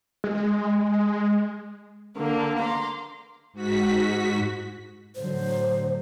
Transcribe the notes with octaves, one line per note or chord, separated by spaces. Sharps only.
G#3
D3 A#3
A#5 C6 D6
G#2 F#4 B6
A2 D3 F#3 C5